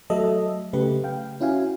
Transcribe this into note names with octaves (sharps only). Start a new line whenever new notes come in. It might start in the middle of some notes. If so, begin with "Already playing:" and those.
F#3 A3 A4 D#5 E5
C#3 A3 G4 B4
F5 G5
C#4 E4 F#4 F5 G#5